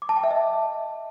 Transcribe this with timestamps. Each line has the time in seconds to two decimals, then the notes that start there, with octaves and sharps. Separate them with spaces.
0.02 D6
0.09 A5
0.16 G5
0.24 E5
0.31 D#5